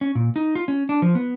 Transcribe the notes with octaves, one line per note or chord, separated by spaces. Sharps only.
C#4
A#2
D#4
F4
C#4
D4
F3
B3